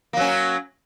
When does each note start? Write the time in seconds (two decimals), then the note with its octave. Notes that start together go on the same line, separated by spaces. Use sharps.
0.13 A#3
0.17 F#3
0.20 C#4